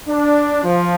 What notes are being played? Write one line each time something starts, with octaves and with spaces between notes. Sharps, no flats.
D4
F3